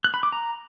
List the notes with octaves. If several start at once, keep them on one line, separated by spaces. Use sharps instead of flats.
F#6
B5
D6
A#5